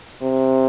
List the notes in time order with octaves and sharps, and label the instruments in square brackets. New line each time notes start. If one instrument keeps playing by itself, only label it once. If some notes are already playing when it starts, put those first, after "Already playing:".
[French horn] C3